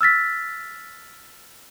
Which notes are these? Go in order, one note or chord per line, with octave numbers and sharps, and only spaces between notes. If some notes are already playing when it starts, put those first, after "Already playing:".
E6 F6 A6 B6